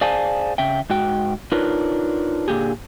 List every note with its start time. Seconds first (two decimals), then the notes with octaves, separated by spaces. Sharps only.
0.01 G#4 C5 D5 F5 G#5 A5
0.58 C#3 E5 G5
0.90 G#2 F#4 G5
1.52 D4 D#4 F4 A#4 B4 C#5
2.48 A#2 D3 G4 G#4